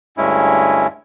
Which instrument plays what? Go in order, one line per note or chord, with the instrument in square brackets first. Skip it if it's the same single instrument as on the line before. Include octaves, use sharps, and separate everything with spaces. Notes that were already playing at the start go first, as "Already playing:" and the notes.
[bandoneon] D2 G2 G#3 C#4 E4